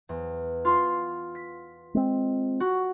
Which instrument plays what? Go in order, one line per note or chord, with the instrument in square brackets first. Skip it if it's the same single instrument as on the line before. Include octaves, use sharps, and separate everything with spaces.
[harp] E2
F4 C6
B6
[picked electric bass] G#3 C4
[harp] F#4